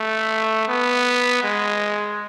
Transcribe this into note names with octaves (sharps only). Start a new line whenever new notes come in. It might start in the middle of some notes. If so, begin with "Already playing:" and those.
Already playing: A3
B3
G#3